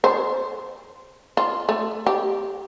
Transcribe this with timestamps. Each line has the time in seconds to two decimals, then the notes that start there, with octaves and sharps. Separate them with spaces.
0.04 C5
1.37 F4
1.69 A3
2.07 G4